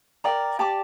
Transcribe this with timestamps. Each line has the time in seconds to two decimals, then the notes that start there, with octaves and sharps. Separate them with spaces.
0.24 A#4 D5 G5 A#5
0.59 G4 D5 A5 D6